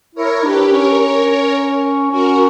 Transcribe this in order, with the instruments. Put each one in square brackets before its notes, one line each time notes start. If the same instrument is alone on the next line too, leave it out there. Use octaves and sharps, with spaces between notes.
[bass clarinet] E4 [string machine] A#4 C#5
[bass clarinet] D4 [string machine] G4 B4
[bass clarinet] C#4 [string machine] A#4 C#5
[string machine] A#4 C#5
A#4 C#5
[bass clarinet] C#4 [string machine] F#4 A#4